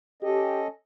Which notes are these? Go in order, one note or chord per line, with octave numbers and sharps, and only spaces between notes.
C#4 G4 A4 D#5